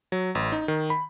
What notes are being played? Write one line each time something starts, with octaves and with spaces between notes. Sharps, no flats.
F#3
A1
D#4
D#3
B5